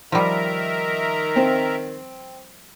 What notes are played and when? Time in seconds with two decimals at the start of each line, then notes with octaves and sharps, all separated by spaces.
0.12 D#3 F3 G3 A#4 E5 A#5
1.36 C4